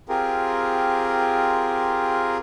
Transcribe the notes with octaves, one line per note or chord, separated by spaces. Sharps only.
C4 F4 G4 G#4 A#4